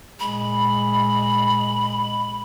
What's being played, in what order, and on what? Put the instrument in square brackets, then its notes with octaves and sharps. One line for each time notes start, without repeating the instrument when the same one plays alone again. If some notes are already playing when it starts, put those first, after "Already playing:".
[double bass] A#2 G#3 [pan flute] B5